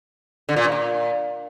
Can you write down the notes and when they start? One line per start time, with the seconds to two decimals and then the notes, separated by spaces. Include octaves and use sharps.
0.49 D3
0.56 A#2
0.64 G2
0.72 A#2